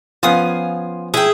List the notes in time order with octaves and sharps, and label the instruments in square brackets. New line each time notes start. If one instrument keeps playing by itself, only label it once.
[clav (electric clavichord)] F3 B3 C#4 [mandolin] F4 G#5 D#6 [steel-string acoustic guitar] F5
[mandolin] E4 G5 [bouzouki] G#4